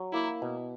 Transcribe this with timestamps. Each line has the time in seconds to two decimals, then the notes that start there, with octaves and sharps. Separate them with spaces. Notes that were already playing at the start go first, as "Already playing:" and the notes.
Already playing: F#3
0.13 A#3 E4
0.42 B2